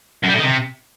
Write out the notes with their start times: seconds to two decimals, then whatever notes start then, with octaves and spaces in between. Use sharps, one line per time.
0.23 F#2
0.28 G3
0.33 A2
0.39 D#3
0.44 C3